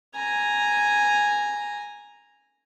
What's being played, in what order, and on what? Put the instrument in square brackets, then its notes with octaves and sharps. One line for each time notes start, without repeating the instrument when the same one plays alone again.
[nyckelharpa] G#5 A#5